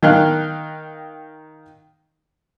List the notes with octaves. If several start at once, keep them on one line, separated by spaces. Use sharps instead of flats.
D#3 D#4 F5 G5 F#6